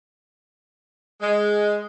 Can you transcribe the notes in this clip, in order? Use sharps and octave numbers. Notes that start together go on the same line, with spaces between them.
G#3